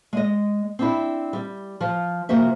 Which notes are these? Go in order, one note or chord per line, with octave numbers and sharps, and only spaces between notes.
G#3 D#5
C4 D4 E4
G3
F3
C3 F3 A#3 F#4 C5 E5